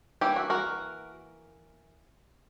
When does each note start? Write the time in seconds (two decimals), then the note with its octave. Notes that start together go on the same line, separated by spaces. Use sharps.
0.21 E3 A#3 D4 E4 G4
0.36 F#4
0.50 F#4 A#4